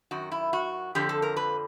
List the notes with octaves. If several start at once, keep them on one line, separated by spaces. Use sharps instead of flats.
F#2 D#3 F#4
E4
F#4
F2 D3 F3 G4
A4
A#4
B4